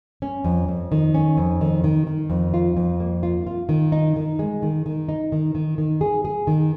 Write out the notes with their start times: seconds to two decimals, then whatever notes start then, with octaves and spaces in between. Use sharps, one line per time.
0.22 C#4
0.44 F2
0.68 F2
0.92 D#3
1.14 C#4
1.37 F2
1.61 D#3
1.84 D#3
2.07 D#3
2.30 F2
2.54 F4
2.77 F2
3.00 A#3
3.23 F4
3.47 F4
3.69 D#3
3.92 D#4
4.16 D#3
4.39 G#3
4.62 D#3
4.86 D#3
5.09 D#4
5.32 D#3
5.55 D#3
5.78 D#3
6.01 G#4
6.25 G#4
6.47 D#3